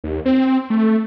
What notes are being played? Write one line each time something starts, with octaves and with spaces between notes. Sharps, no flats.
D#2
C4
A3